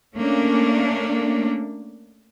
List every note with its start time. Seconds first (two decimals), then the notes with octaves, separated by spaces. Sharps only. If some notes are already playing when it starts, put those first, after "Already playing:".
0.15 A3 A#3 C#4 D4